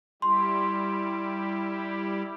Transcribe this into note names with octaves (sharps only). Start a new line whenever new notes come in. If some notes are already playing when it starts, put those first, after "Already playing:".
G3 E4 G4 C6